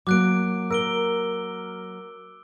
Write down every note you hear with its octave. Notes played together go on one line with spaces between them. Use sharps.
F#3 A#3 D6 F#6 D7
A#4 E6 D7 G7